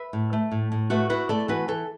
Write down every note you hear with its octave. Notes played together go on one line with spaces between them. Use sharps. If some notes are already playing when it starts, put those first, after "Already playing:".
Already playing: B4 E5
A2
A3
A2
A2
A3 F#4 B4
E4 F#4 B4
A3 A4 D5
E3 F#4 B4
E3 A4